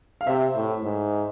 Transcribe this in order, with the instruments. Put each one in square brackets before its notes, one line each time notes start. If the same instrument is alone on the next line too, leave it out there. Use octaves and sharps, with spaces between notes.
[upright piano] F5
[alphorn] C3 [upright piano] C5 E5
[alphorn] A2
G#2